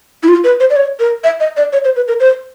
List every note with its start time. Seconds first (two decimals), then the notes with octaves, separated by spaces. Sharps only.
0.23 E4
0.28 F4
0.44 B4
0.60 C5
0.70 D5
0.76 C#5
1.00 A#4
1.24 E5
1.40 D#5
1.57 D5
1.73 C#5
1.84 C5
1.96 B4
2.08 A#4
2.20 C5